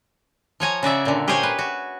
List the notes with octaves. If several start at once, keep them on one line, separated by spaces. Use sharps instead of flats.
F3 C#5 G#5 A#5
C#3 F#4 D5 E5
A#2 D3
G4 G#4 A#4 C5 C#5 G#5
B4
F#4